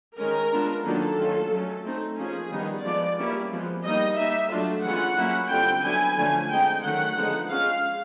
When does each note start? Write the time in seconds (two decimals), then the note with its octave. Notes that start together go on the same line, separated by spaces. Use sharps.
0.18 D#3 G#3 C#4 A#4
0.52 G#3 B3 D4 F4
0.85 D#3 F#3 A#3 D4 F4 A4
1.18 D#3 F#3 A3 C#4 F4
1.52 F#3 A3 C#4
1.85 A3 C4 D#4
2.18 F3 A#3 C#4 G#4
2.52 D#3 G3 B3 D#4
2.85 F3 G#3 B3 D5
3.19 G3 A#3 C#4 E4
3.52 F3 G#3 B3
3.85 G3 A#3 D#4 D#5
4.18 G3 A#3 D#4 E5
4.51 F#3 A3 D4 F4
4.84 E3 G#3 C#4 F4 F#5
5.18 F#3 A#3 C#4 E4
5.51 D3 G3 C4 F4 G5
5.84 D3 F#3 B3 E4 G#5
6.18 D3 F3 A3 C#4
6.51 G#3 C4 D#4 G5
6.84 D#3 F#3 A3 C#4 F#5
7.18 D3 F3 G#3 B3 D#4
7.51 G#3 C#4 F4 F5